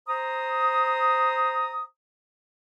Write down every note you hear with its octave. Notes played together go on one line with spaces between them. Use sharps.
C5 A#5 D#6